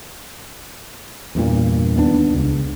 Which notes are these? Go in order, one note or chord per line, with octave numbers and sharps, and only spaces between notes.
E2 G2 A#2
D#2 B3 D4
C#2